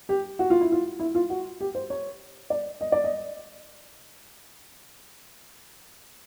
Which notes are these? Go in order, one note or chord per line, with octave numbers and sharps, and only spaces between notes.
G4
F#4
F4
E4
F4
E4
F4
F#4
G4
C5
C#5
D5
D#5
D5
D#5